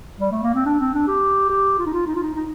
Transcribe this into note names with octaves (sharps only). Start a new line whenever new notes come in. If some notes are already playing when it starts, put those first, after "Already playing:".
G3
A3
A#3
C4
D4
C4
D4
G4
G4
F4
D#4
F4
D#4
F4
D#4
D#4